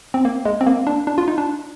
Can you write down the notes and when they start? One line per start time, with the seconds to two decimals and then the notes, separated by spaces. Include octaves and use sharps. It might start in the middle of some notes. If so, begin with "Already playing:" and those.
0.14 C4
0.25 A#3
0.45 G#3
0.61 C4
0.67 A#3
0.87 D4
1.07 D4
1.18 F4
1.28 D#4
1.38 D4